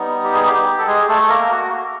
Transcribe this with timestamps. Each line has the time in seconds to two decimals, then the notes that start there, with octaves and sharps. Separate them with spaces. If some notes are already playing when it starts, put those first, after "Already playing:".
Already playing: G3 B3 D#4
0.23 G4
0.34 G#4
0.46 G4
0.79 A4
0.87 G#3 G#4
1.08 A3 A4
1.22 A4
1.29 A#3 A#4
1.51 F#4